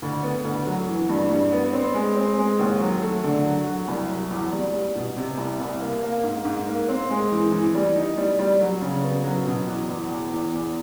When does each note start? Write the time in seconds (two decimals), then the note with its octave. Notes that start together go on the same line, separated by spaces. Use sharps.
0.02 D2
0.23 B3
0.45 D2
0.66 F#3
0.87 E3
1.09 G2
1.31 G2
1.52 B3
1.73 C4
1.94 G#3
2.16 C4
2.38 G#3
2.59 D#2
2.80 F#3
3.02 A3
3.24 D3
3.45 F#3
3.66 F#3
3.88 C2
4.09 F#3
4.31 E2
4.52 G3
4.73 G3
4.95 B2
5.17 C3
5.38 C2
5.60 C2
5.80 A#3
6.03 A#3
6.23 G#2
6.45 G#2
6.67 A#3
6.88 C4
7.10 G#3
7.32 E3
7.52 E3
7.74 G3
7.96 D#4
8.17 G3
8.39 G3
8.60 F#3
8.81 C#3
9.02 B3
9.24 F#3
9.46 B2
9.67 E2
9.89 E2
10.09 E2
10.31 E2
10.52 E2